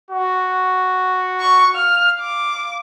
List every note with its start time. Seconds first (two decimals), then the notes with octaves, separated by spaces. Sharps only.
0.11 F#4
1.40 C#6
1.75 F5 F6
2.20 D6